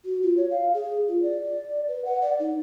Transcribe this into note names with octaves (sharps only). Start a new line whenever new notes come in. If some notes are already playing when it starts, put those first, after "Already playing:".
F#4
F4
C#5
F5
G#4
F4
D5
B4
F#5
D5
D#4